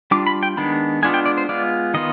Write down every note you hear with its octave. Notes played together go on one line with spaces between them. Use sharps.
G3 D4 F4 D6
B5
G5
D#3 G#3 B3 D4 B5
G#3 B3 D4 F4 G#5
G5
D5
C5
G#3 B3 F4 D5
D#3 B3 F4 D#5